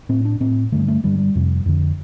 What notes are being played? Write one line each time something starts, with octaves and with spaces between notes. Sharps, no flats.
A2 C4
D4
A2 C4
G2 D3 A3
A3
G2 D3 G3
G3
F2 C3
F2 D3